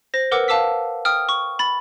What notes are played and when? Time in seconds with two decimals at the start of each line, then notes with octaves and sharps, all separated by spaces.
0.14 C5 A#6
0.31 A#4 B4 F#5 D6 E6
0.48 F5 A5 D6 E6 B6
1.05 G5 D#6 F6
1.29 C#6
1.59 B5 A6